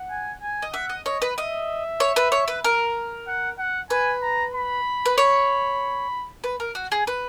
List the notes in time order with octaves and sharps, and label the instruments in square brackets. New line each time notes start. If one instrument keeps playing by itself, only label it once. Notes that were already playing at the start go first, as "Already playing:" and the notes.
Already playing: [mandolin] F#5
[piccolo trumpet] G#5
G#5
[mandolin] D#5
[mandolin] E5 [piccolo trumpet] F#5
[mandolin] D#5
[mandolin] C#5 [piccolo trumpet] D#5
[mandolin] B4
[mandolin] D#5 [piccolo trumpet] E5
[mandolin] C#5
B4
C#5
B4
A#4
[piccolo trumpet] F#5
F#5
[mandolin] B4 [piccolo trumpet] G#5
[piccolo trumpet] A#5
B5
[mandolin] B4
C#5
B4
A#4
F#4
G#4
B4